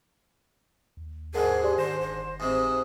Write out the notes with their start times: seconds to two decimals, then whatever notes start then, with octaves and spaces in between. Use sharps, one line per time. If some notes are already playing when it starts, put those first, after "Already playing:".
0.97 D#2
1.34 G#2 D3 G#4 A#4 F#5
1.63 G4 D5 C6
1.78 D#3 C5 A#6 E7
2.01 F#1 C5
2.40 G#2 C3 D#6